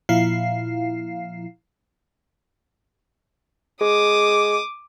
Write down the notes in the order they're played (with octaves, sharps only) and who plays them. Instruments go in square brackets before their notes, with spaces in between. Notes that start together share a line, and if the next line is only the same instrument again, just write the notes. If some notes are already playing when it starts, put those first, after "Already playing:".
[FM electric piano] A#2 F3 E4 F5 C7
[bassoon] G#3 [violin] D6 D#6